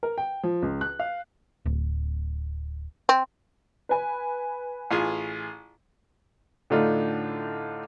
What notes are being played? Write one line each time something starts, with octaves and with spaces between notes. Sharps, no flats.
A#4
G5
F3
C#2
F#6
F5
D1
C4
B4 G#5
A1 F4 G#4
A2 D3 A3 D4 D#4 F4